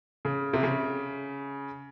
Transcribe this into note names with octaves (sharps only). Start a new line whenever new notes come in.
C#3
C3
C#3